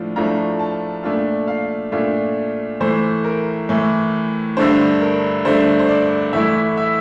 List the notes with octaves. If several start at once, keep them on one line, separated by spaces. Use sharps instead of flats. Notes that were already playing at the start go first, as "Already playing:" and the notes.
Already playing: A2 F3 A3 D4 F4
A2 F3 A3 D4 F4 A#5
A5
A#2 A3 D4 F4 A5
F5
A#2 A3 D4 F4
A2 E3 A3 C5
A#4
A2 E3 A3
G2 D3 A3 D4 C5
A#4
G2 D3 A3 D4 C5
C5
D5
A2 E3 A3 E4 E5
E5